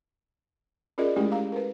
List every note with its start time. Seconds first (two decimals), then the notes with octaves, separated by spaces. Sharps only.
0.98 C#4 F4 G#4 A#4 D5 D#5
1.16 G#3 A3 C#4 E4 G4 A#4
1.32 F5 A#5
1.52 A#4 B4